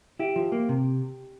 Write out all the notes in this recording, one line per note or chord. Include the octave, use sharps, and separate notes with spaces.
E4 G4
F3
A#3
C3